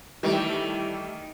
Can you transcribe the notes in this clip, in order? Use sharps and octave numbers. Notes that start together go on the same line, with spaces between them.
D#3 E3 G3 A3